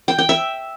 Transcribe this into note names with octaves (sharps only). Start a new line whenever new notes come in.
G5
G5
E5